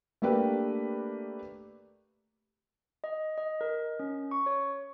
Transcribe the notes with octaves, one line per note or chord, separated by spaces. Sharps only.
A3 A#3 D4 G4 B4 G5
D#5
D#5
A#4
C#4
C#6
C#5